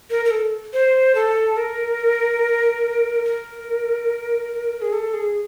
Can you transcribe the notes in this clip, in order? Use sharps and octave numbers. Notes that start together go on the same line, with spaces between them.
A#4
A#4
A4
C5
A4
A#4
A#4
G#4
A4
G#4